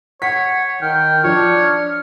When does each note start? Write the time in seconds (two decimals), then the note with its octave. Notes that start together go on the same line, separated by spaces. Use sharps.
0.22 C#5 F#5 B6
0.82 D#3 G5 F6
1.24 F3 D4 C#5